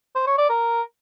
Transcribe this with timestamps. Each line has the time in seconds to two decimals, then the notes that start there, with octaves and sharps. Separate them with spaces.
0.15 C5
0.27 C#5
0.38 D5
0.49 A#4